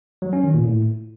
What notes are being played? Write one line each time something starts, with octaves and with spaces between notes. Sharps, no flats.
F#3
C#4
D#3
A#2
A2